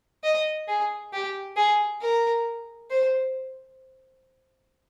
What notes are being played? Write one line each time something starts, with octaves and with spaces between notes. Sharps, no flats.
D#5
G#4
G4
G#4
A#4
C5